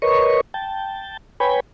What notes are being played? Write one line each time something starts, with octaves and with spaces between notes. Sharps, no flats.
A#4 B4 C#5 D#5 C#6
G5 A5
B4 C#5 G5 G#5 B5